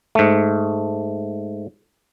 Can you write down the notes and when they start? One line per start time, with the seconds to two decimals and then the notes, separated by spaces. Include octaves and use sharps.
0.15 G#2 A3